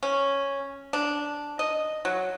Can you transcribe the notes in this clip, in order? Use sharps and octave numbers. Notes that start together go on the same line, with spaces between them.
C#4
D4
D#5
F#3